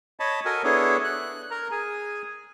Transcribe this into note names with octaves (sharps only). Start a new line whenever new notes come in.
C#5 D#5 A5 B5
F#4 A4 A#4 D#5 G#5
B3 D4 E4 G#4 A4 C#5
F#6
A#4 A#5
G#4 G#5